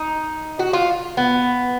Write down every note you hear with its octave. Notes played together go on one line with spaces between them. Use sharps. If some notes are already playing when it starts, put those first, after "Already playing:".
Already playing: D#4
F#4
F4
B3